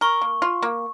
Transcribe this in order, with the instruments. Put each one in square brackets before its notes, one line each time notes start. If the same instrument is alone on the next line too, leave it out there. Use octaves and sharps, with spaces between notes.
[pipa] A#4 [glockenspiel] C#6
[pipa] A#3
F4
A#3